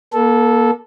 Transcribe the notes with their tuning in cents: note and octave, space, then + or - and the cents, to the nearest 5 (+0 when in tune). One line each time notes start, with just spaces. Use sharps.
A#3 +30 A4 -10